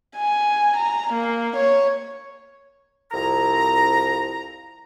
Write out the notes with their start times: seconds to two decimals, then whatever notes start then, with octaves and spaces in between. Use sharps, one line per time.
0.16 G#5
0.77 A#5
1.13 A#3
1.57 C#5
3.12 C2 F2 E4 A#5